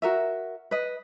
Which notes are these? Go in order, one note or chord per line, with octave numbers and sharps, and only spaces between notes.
F#4 A#4 E5
B4 D#5